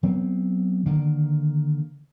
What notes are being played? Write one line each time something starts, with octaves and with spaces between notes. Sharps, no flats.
F#3 B3 C4
D3 D#3 A#3